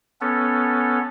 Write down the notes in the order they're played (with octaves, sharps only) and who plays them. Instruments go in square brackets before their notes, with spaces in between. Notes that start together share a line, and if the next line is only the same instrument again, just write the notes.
[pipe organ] B3 C#4 A4